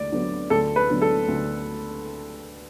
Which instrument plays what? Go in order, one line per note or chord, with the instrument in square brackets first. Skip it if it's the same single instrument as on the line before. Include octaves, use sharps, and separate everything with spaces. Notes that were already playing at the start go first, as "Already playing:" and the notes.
Already playing: [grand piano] D2 D3 [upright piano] D5
[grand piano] D3 F#3 B3
[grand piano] D2 [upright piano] A4
[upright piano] B4
[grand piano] D3 F#3 B3
[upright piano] A4
[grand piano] D2